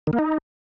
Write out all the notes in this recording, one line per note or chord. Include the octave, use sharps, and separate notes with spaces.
D#3
A#3
D#4